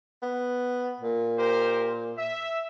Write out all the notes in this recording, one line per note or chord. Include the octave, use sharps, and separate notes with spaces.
B3
A#2
G4 A#4 C5
E5